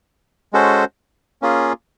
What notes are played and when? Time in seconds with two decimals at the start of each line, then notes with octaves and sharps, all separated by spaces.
0.53 G#3 C#4 F#4 A4 C5
1.42 A#3 C#4 F4 G#4